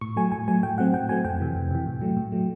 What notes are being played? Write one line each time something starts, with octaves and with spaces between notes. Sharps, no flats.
A2 C#6
F#3 A3 G#5
A2 G#5
F#3 A3 G#5
A2 G5
F#3 A3 C4 F#5
A2 G5
F#3 A3 C4 G#5
F2 G5
C3 E3
F2
C3 E3
A2
F#3 A3
A2
F#3 A3